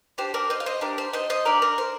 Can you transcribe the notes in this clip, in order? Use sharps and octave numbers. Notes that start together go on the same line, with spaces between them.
D4 G4 C5
A#4 D5
C5 D#5
F5
C5 D#5
D4 G4 A#4
C5
C5 D#5
C5 D#5
D4 G4 A#4 D5
A#4
C5